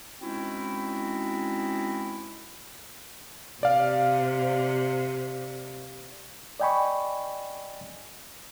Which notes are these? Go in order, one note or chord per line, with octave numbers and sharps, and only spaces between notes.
G#3 C4 C#4 D#4 E4 F#4
C3 D5 F5
D5 D#5 G5 G#5 B5 C#6